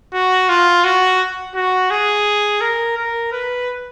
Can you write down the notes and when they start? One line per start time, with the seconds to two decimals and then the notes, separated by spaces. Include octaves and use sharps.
0.14 F#4
0.49 F4
0.84 F#4
1.55 F#4
1.91 G#4
2.61 A#4
2.97 A#4
3.32 B4